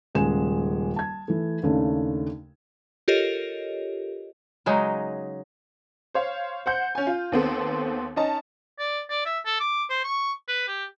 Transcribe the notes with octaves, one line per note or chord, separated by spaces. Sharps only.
D#1 C#3 G#3 G#5 E7
A5 G#6
E3 A3
D#2 C#3 A3 D4
F4 G4 A4 A#4 C#5 D#5
C#3 F#3 G#3 D#4
C5 C#5 F5
C5 F#5 G6
C#4 G#5
F4
D#2 B3 C4 A4
C#4 D#4 D#5 A5
D5
D5
E5
A4
D6
C5
C#6
B4
G4